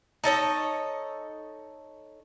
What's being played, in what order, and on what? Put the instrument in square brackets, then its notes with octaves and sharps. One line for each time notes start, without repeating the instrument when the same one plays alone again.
[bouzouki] D#4 A4 C#5 D#5